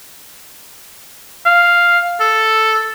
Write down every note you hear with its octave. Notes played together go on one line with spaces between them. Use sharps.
F5
A4